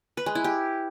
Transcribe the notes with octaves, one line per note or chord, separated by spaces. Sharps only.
B4
G#3
E4
G4